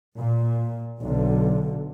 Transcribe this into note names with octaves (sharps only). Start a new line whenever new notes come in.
A#2
B1 D3